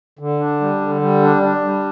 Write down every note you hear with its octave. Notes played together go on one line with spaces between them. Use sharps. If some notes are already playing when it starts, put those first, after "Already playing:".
D3
D4
G3
D3
G3
D4
D4
G3